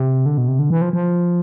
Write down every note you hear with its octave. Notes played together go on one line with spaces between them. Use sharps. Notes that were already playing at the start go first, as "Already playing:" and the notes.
Already playing: C3
D3
B2
C3
D3
E3
F3
F3